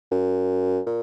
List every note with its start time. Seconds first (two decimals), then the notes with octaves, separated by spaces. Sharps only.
0.11 F#2
0.86 A#2